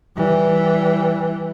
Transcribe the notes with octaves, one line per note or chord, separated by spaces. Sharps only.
E3 G3